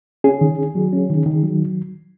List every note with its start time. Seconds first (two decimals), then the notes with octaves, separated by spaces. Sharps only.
0.24 C#4 G#4
0.41 D#3
0.58 D#3
0.75 F#3
0.93 C#4
1.10 D#3
1.26 D#3
1.43 F#3